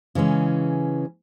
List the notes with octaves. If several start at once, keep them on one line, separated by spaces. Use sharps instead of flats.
C#3 E3 G#3 C#4